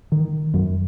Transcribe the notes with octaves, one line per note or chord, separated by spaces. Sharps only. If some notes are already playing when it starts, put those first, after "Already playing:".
D#3
F#2